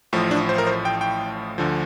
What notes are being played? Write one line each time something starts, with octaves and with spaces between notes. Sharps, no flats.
A1 A2 F3
D4
C5
A#4
C5
G5
G5
D2 D3 F3